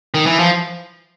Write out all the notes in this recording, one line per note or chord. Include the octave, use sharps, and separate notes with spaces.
D#3
E3
F3